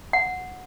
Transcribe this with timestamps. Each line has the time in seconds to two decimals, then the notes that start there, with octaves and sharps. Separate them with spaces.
0.13 F#5